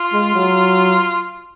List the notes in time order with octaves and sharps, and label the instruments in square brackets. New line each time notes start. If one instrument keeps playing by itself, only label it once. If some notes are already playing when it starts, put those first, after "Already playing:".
Already playing: [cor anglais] F4
[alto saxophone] G#3
F#3